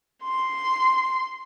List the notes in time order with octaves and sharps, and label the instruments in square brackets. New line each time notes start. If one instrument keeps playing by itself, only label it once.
[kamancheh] C6